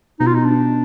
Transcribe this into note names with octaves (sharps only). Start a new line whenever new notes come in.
B2 D#4
F4
D#4
D4